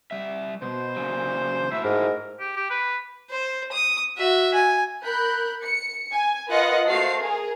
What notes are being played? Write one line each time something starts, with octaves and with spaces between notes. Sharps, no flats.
G3 E5
B2 C5
A#2 C#3 F#3
A3 E4 F#4 E5
G#2 A#4
G4
G4
B4
C5
D#6
F#4 E5
G#5
A#4 B5 F#6 G6
C#7
G#5
F4 A#4 B4 D#5 F#5
A3 F#4 C5 F5 A5 C7
G#4 A#4